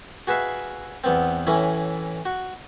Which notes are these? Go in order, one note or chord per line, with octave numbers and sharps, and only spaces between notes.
F#4 G#4 B4 E5 F5
E2 B3 C4
A2 E3 C#4 E4
F#4